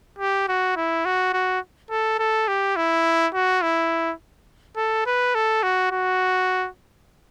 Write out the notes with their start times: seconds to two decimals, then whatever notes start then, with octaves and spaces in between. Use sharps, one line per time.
0.18 G4
0.48 F#4
0.76 E4
1.05 F#4
1.33 F#4
1.90 A4
2.19 A4
2.48 G4
2.76 E4
3.34 F#4
3.62 E4
4.76 A4
5.06 B4
5.34 A4
5.63 F#4
5.91 F#4